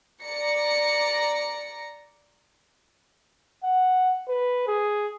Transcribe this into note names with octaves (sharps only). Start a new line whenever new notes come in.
D5 A#5 A#6 C#7
F#5
B4
G#4